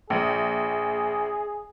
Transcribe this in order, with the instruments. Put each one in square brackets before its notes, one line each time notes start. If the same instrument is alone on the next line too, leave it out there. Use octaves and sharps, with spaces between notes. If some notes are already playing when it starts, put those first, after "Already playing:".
[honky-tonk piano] A#1 [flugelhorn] G#4